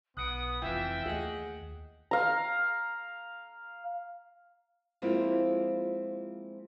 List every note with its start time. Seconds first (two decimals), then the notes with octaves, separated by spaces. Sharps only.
0.17 B1 B3 D#6 F#6 C#7 D7
0.62 F1 E3 C4 F4 E5 G5
1.06 D#2 A3 G#4 D#5 F#5
2.11 F5 A#5
5.02 F3 G#3 A#3 C4 E4 F4